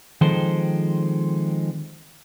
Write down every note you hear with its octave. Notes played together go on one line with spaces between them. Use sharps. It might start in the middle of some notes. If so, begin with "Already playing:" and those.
D#3 F3 G#3 C4 A4 C5